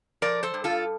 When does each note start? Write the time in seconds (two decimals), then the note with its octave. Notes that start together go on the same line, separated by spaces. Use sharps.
0.22 F3 A#4 D5
0.43 A4 C5
0.54 G2
0.64 F4 A4